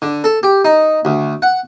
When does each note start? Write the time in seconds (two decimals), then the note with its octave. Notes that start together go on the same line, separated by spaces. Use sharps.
0.02 D3
0.24 A4
0.43 G4
0.65 D#4
1.05 D2
1.42 F#5